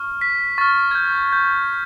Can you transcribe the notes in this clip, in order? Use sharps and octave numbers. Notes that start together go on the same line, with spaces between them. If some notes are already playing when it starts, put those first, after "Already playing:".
Already playing: C#6 F6
B6
C#6 F6 A6
G#6
G6
G6